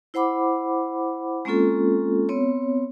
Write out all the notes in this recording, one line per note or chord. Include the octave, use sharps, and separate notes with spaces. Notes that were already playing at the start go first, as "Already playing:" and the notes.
E4 C5 F#5 B5 D6
G#3 A#3 C4 C#4 F4 A4
B3 C4 C#5